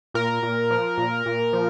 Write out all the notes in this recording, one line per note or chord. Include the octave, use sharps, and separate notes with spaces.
A#2 A#4
A#2
F3
A#2
A#2
F3